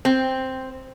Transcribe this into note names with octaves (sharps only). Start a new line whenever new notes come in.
C4